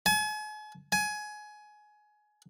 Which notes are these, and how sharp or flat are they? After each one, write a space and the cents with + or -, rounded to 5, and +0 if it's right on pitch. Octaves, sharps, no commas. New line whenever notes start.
G#5 +40
G#5 +20